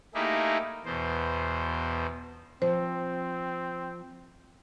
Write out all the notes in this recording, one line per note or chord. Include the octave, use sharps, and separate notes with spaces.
A3 A#3 D#4 E4 G4 G#4
E2 B2 C5
F3 C4 C5